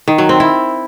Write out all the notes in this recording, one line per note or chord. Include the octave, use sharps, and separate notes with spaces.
D#3
F#3
C4
E4